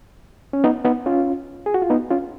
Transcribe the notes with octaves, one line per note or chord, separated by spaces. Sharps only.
C#4
B3 D#4
B3 D#4
C#4 F4
G#4
F#4
F4
B3 D#4
C#4 F4